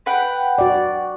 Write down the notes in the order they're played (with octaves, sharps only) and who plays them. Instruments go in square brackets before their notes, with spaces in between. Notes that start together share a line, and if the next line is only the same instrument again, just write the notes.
[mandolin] B4 F#5 G5
[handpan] F#4 D5